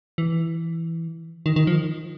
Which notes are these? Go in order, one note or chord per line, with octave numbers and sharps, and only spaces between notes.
E3
D#3
D#3
F3